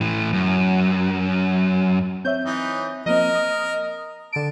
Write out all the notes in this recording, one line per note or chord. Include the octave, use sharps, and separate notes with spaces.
A2 E3
F#2
C4 C#5 E5 G6
E3 D#4
F3 A#3 C4 A#4 D#5
D#6
D3 A5 D7